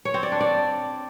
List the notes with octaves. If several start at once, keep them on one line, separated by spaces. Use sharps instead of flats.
C#5
C4
D5
D4
D5